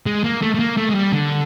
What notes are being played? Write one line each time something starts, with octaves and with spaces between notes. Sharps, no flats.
G#3
A#3
A3
A3
A#3
A3
G#3
G3
D3